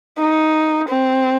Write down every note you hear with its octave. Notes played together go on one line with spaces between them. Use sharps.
D#4
C4